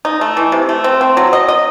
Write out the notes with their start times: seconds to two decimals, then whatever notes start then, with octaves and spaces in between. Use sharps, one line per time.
0.05 D#4
0.21 A3
0.37 E3
0.52 C3
0.69 A3
0.84 C4
1.01 C4
1.17 F#3
1.33 D#5
1.48 D#5